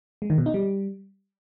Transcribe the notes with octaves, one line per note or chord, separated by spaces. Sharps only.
G#3
D#3
B2
D#4
G3